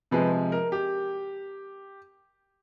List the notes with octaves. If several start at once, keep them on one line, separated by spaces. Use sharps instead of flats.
C3 F3 G#3 B4
A#4
G4